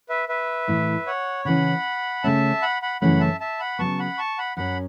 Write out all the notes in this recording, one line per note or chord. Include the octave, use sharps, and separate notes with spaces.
B4 E5
B4 E5
A2 E3 A3 E4
C#5 F#5
C#3 E3 C#4 F#5 B5
C#3 A3 C#4 E5 A5
F#5 B5
F#5 B5
F#2 C#3 E3 A3 C#4 F#5 B5
E5 A5
E5 A5
F#5 B5
C#3 F#3 B3 A5 C#6
F#5 B5
A5 C#6
F#5 B5
F#2 F#3 C#4 F#5 B5